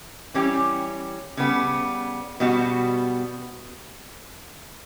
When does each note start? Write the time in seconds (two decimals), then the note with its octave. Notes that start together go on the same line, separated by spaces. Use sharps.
0.34 E3 G3 C#4 G4
1.37 C#3 G3 B3
2.40 B2 G3 B3 F#4